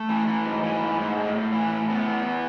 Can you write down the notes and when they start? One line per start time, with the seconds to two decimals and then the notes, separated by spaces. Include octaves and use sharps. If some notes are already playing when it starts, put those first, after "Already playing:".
Already playing: A3
0.09 E3
0.27 E3
0.45 G#2
0.63 E3
0.82 G#2
0.99 G#2
1.17 A2
1.35 A2
1.53 E3
1.71 A2
1.89 A2 B3
2.08 E3
2.25 E3